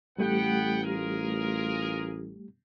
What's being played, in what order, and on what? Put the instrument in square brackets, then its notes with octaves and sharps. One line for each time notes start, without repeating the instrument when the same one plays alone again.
[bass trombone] A1 [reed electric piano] G3 A3 G4 [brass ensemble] B3 F#5 G5
[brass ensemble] F4 G#4 A#4